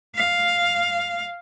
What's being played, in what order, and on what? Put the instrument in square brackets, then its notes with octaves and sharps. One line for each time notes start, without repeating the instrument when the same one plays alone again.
[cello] F5